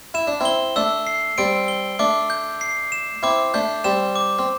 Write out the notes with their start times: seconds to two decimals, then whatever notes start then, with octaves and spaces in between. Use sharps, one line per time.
0.14 E4 E7
0.27 D4
0.40 C4 E4 G7
0.76 A3 D4 E6
1.07 C7
1.38 G3 C4 D7
1.68 G7
1.99 A3 D4 D6
2.30 G6
2.61 C7
2.92 E7
3.23 C4 E4 D6
3.54 A3 D4 G6
3.84 G3 C4 E7
4.16 D6
4.39 C4